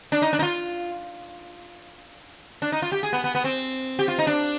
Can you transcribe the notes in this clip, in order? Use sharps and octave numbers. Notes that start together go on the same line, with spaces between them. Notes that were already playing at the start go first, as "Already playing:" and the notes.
D4
D#4
D4
D#4
F4
D4
D#4
F4
G4
G#4
B3
B3
B3
C4
G4
F4
D#4
D4